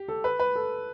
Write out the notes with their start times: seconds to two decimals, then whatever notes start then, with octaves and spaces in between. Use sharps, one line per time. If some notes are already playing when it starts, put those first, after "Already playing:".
Already playing: G4
0.08 A4
0.24 B4
0.40 B4
0.55 A4